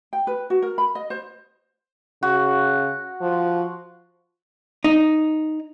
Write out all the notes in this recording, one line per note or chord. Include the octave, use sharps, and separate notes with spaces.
G5
B4
F#4
A#4
B5
D#5
C5
C#3 F#4
F3
D#4